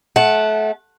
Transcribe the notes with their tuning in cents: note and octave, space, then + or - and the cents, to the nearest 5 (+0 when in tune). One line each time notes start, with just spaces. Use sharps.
A3 -30 F#5 +0 A5 -5